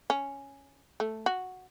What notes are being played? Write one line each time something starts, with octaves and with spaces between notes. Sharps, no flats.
C#4
A3
F#4